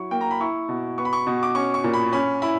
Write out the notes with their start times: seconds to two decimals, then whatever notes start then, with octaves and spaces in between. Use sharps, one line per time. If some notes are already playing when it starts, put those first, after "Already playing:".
Already playing: F#3 E4 C#6
0.11 A#3 G5
0.21 A#5
0.31 B5
0.40 E4 C#6
0.69 B2
0.98 B3 C#6
1.05 B5
1.13 C#6
1.27 B2
1.43 D6
1.55 C#4 C#6
1.74 C#6
1.84 A#2
1.94 B5
2.13 C#4 B5
2.42 E4 B5